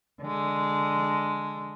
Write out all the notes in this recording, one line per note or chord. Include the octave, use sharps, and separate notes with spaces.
D3 G#3